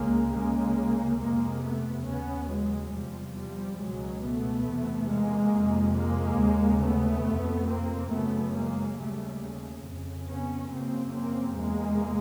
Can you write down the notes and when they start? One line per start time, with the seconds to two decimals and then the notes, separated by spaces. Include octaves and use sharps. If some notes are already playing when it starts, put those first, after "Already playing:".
Already playing: C#2 C#3 G#3 A#3
0.33 C#2 C#3 G#3 A#3
1.19 F2 C3 G#3 A#3
1.63 A3 B3
2.06 D#2 C#3 B3 C#4
2.49 F#3 G#3
2.92 E2 C3 F3 G3
3.35 F3 G3
3.79 C#2 B2 F#3 G#3
4.22 A3 B3
4.65 E2 C3
5.08 G#3 A#3
5.52 F2 C3
5.95 G#3 A#3
6.38 D#2 C#3
6.81 A3 B3
7.24 F2 C3
7.68 A#3 C4
8.11 F#2 C#3 A3 B3
8.54 G#3 A#3
8.97 D#2 C#3 G3 A3
9.83 F2 C#3
10.27 B3 C#4
10.70 F#2 C#3 A#3 C4
11.13 A#3 C4
11.56 E2 C3 G#3 A#3